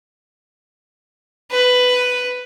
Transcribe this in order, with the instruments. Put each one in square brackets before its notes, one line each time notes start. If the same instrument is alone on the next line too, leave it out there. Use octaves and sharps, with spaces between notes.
[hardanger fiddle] B4